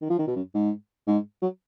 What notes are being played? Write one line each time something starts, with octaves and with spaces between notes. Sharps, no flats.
D#3
F3
D#3
B2
F#2
G#2
G#2
F#3